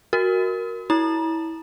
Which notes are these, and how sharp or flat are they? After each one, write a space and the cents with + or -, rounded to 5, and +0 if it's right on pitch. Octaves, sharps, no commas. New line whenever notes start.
F#4 +0 A#4 +0
E4 -20 A#5 +40